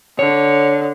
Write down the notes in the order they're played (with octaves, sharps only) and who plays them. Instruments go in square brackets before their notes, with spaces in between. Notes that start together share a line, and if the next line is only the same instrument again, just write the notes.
[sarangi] D3 [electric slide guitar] C#5